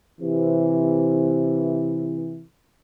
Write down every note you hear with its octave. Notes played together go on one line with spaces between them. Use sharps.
C3 E3